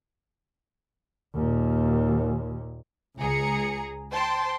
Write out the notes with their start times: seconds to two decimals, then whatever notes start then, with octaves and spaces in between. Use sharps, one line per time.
1.35 D#2 A#2
3.19 C#2 G#4 A#5 C#7
4.12 C5 G5 A5 C6